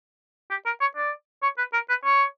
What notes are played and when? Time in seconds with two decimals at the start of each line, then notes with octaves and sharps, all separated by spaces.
0.51 G4
0.66 A#4
0.81 C#5
0.97 D5
1.43 C#5
1.58 B4
1.73 A#4
1.89 B4
2.04 C#5